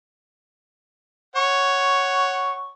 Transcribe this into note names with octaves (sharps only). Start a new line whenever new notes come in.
C#5 F#5 C#6